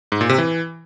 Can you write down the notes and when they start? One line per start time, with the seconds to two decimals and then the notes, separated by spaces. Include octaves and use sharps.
0.12 G#2
0.21 A#2
0.29 C3
0.38 E3